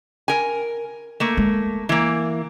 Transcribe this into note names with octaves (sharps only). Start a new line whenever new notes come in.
A#4 G#5
A3 A#3
G#3
E3 A#3